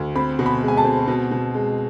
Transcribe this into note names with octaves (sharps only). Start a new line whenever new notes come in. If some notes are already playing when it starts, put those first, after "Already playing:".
Already playing: D2
C4 B5
B2
B5
G#3
G#5
A5
C4
B2
B2
G#3